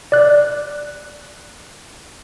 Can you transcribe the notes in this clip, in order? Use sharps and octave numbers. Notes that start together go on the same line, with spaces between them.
D5 F#6